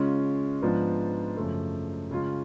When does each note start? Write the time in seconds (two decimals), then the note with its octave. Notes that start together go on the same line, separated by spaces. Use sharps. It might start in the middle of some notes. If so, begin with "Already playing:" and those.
Already playing: C#3 G#3 C#4 F4
0.62 G#2 F3 B3 D4 F4
1.37 F#2 C#3 F3 A3
2.11 C#3 G#3 C#4 F4